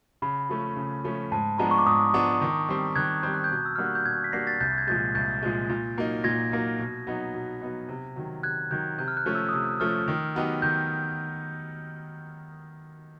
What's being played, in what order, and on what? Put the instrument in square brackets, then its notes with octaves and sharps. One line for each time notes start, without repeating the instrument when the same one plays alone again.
[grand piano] C#3 [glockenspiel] B5
[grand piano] F3 A3 C#4
C#3
F3 A3 C#4
[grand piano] G#2 [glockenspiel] A5
[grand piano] F3 G#3 B3 D4 [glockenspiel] A#5
[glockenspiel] C#6
D6
[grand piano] G#2 [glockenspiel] D#6
[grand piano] F3 G#3 B3 D4
D#3
G3 C4
[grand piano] D#3 [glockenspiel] F#6 G#6
[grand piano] G3 C4 [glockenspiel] G6
[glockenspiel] F#6
G6
[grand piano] B2
[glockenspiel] E6
[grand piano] G3 A#3 D4 F#4 [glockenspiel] F6
[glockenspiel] F#6
G6
[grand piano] B2 [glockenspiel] F#6 G#6
[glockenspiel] B6
[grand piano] G3 A#3 D4 F#4 [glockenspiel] A#6 C7
[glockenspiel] A6 B6
[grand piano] C2 [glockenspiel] G6 A6
[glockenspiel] G#6
[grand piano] A#2 F3 G#3 [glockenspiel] G6 A6
[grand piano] C2 [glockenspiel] G6 A6
[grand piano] A#2 F3 G#3
A#2
F#3 A#3 D#4
[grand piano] A#2 [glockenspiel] G#6 A#6
[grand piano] F#3 A#3 D#4
B2
F#3 B3 D#4
B2
F#3 B3 D#4
C3
D#3 F#3
[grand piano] C3 [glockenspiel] F#6 G#6
[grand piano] D#3 F#3 [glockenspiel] G6
[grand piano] C3 [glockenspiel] G6
[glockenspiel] F6
F#6
[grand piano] F3 A3 C#4
[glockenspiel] E6
D#6
[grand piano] C3 [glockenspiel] E6
[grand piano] F3 A3 C#4 [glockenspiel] F6
[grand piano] D#3
F#3 B3 D#4 G4
[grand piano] D#3 [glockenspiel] G6